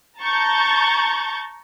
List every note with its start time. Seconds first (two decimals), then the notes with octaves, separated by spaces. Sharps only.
0.19 A5 A#5 C#6 G6 A6